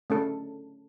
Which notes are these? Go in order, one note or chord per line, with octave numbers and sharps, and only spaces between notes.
A3 C#4 A4